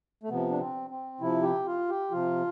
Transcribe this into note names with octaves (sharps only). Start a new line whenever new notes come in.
A3
C3 F3 B3
D4
C4
C4
C3 F3 E4
G4
F4
G4
C3 F3 F4